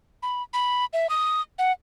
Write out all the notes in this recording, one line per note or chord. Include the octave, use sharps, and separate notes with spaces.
B5
B5
E5
D#6
F#5